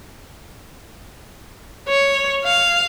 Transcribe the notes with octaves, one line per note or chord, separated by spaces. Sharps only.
C#5
F5